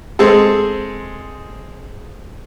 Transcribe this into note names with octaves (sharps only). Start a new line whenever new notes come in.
G#3 C4 G#4 A4